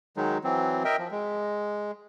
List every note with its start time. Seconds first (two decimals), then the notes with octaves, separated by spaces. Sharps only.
0.17 D#3 F#3 G#3 D#4
0.44 E3 F#3 C4
0.85 A#4 D#5 E5 G5
0.99 F3
1.11 G#3